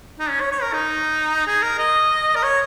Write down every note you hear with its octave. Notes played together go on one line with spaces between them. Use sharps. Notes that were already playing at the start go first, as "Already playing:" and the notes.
D#4
C#4
C#5
C#5
A#4
D#4
G#4
A#4
D#5
A#4
C#5